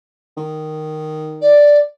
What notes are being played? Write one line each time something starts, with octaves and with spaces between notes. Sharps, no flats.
D#3
D5